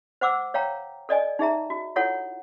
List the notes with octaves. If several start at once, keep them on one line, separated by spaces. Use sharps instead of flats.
C5 F#5 D6 E6
C#5 F5 G5 A#5
A4 D5 D#5 G#5
D#4 G#4 E5 A#5
F#4
E4 F4 A4 C#5 F#5